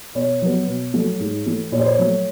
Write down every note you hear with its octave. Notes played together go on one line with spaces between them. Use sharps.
B2 C#5
F#3 B3
B2
F#3 A3
G#2
E3 A3
A#2 C#5
C5
C#5
F#3 A3